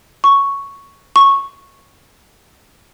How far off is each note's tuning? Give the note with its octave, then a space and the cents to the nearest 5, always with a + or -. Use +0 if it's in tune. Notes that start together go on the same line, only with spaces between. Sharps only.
C#6 +0
C#6 -10